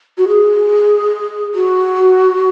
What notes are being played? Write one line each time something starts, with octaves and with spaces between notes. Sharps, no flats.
F#4
G#4
F#4